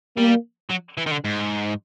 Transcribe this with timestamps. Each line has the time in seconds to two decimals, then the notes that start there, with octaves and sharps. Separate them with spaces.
0.17 G3 A#3
0.71 F#3
0.98 E3
1.06 D#3
1.11 D3
1.25 G#2